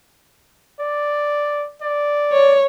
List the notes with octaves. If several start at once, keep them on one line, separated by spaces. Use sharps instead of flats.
D5
D5
C#5